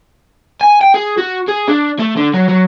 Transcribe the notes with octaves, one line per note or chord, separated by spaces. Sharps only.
G#5
G5
G#4
F#4
G#4
D4
A3
D3
F#3
F#3